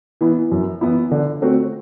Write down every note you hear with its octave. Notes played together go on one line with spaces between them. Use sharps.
E3 B3 E4
F#2
E3 B3 E4
D3
A3 C4 F#4